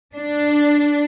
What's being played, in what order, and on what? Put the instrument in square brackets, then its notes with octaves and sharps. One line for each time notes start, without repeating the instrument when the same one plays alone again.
[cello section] D4